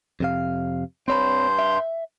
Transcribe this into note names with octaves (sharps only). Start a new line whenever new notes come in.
F2 C3 F5
G2 C4 C#5 B5 C6 G6
E5